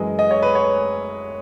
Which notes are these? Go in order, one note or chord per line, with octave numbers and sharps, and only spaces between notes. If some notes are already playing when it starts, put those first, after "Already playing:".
Already playing: F#2 E3 G#3 D#5
D#5
C#5
B4
C#5